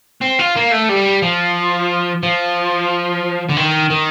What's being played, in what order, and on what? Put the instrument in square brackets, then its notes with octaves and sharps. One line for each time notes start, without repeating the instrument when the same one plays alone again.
[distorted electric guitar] C4
F4
A#3
A3
G3
F3
F3
D3
D#3
D#3